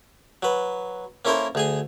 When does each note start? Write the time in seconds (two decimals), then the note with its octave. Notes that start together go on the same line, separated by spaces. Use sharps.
0.43 F#3 B4
1.25 A#3 C#4 E4 A4 A#4 C5
1.55 D2 G#4 G#5